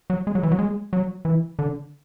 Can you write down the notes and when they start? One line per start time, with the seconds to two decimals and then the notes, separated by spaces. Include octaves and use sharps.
0.10 F#3
0.27 G#3
0.35 F#3
0.43 E3
0.52 F#3
0.59 G#3
0.93 F#3
1.25 E3
1.59 D3